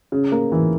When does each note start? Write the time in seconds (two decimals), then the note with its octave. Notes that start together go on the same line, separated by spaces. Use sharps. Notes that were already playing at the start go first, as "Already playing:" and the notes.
0.12 C#3
0.32 A#3
0.52 E3